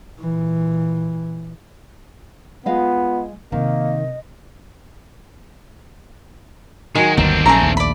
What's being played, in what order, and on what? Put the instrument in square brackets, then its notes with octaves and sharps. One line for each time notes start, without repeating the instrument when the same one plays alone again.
[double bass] A#2 E3
[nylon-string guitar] G#3 D#5 F5 [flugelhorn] B3 [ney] F4
[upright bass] C3 [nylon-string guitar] D#3 [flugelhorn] A#3 [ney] D#5
[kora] D#3 F#3 [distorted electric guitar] G#3 [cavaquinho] G#5
[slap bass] G1 D#2 [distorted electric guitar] C4 D4 [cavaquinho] A#4
[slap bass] A#1 F#3 C#4 [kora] A3 [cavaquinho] G#4 A#5
[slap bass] A#1 D#2
[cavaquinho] D5 B5